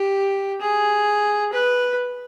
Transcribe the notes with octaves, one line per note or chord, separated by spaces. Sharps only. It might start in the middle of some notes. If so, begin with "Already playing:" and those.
Already playing: G4
G#4
B4